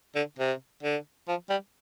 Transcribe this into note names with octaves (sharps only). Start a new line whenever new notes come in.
D3
C3
D3
F3
G3